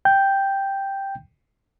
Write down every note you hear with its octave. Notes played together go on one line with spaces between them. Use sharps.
G5 G6